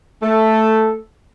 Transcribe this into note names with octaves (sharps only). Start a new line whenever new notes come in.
A3 A4